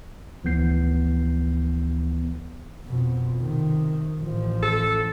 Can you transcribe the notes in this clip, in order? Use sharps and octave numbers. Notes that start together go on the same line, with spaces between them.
D2 E3 F3 B3 G6 C7
F2 B2
C3 D#3
A1 F3
A4